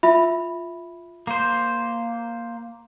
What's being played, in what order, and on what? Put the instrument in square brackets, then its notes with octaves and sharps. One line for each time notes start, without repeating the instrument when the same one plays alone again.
[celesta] F4 E5 B5
[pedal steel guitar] A#3 C5